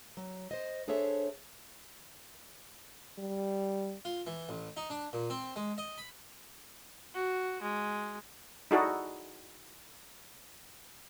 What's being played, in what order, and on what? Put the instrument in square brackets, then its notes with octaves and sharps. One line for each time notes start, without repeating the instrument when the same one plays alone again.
[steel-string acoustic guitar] F#3
C5 D#5
D4 G#4 A4 C5 C#5 E5
[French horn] G3
[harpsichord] F4
E3
A1
D#4
D4
A#2
C4
G#3
D#5
B5
[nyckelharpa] F#4
G#3
[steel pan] D#4 E4 F#4 G#4 A4 D5